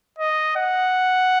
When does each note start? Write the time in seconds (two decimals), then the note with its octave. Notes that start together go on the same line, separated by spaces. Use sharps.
0.19 D#5
0.56 F#5